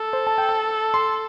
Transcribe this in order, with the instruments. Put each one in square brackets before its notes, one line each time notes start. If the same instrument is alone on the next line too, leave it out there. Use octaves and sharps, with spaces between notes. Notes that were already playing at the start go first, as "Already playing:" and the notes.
Already playing: [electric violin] A4
[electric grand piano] C5
A5
G5
A5
C6